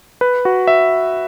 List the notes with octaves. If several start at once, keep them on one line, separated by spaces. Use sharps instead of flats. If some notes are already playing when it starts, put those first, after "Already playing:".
B4
F#4
E5